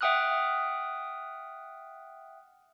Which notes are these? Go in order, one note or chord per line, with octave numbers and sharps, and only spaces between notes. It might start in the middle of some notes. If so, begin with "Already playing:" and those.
E5 F#5 G5 D#6 F6 F#6